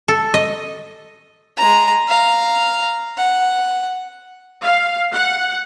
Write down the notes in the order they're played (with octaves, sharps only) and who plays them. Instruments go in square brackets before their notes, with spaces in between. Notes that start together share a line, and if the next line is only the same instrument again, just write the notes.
[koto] A4
D#5
[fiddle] G#3 A#5
F5 A#5
F#5
[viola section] F5
F#5